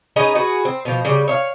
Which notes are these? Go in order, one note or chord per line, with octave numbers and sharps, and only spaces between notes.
C#4 D#4 G#4 B4
F#4 G#4 B4
C4
B2 F3
C#3 G3
C#5 E5 F5